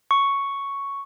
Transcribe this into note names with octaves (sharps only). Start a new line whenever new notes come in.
C#6